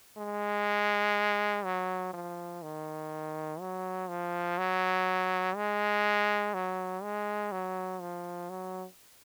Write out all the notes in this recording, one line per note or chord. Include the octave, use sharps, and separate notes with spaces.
G#3
F#3
F3
D#3
F#3
F3
F#3
G#3
F#3
G#3
F#3
F3
F#3